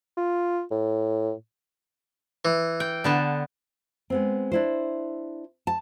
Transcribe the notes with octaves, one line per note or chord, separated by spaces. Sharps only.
F4
A2
E3
G5
D3 B3 A5
G#3 B3 C4
D4 E4 C5
A5